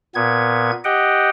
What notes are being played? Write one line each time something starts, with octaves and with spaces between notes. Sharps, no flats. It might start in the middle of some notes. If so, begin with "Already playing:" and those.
A#2 B3 G#6
G4 D#5 F#5 G5